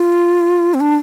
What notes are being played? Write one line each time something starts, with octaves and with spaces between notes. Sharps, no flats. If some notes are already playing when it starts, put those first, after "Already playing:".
Already playing: F4
C4
D4